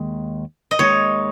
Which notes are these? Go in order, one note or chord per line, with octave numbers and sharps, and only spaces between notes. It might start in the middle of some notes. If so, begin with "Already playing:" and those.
Already playing: D#2 D#3 G#3
D#5
D#2 D#3 G#3 D#4 C#5